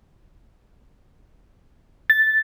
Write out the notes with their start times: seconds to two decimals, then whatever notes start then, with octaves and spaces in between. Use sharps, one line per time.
2.10 A6